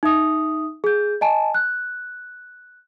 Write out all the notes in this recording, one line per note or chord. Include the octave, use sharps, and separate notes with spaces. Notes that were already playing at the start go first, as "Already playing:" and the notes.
D#4 E5 D#6
G#4 G6
D#5 G#5 A5
F#6